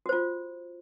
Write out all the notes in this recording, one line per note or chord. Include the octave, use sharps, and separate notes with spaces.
F4 F#4 C5